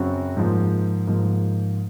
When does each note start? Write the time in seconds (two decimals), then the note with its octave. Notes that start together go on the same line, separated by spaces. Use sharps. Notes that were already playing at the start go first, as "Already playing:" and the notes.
Already playing: F#2 C#3 F#3 C4 F#4
0.37 G#2 F3 A#3
1.07 G#2 F3 A#3